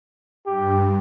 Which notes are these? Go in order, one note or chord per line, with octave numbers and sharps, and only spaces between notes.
G2 G4